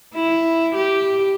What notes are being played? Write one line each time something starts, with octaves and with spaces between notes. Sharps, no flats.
E4
G4